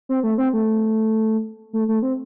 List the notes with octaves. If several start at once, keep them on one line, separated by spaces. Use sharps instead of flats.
C4
A3
C4
A3
A3
A3
C4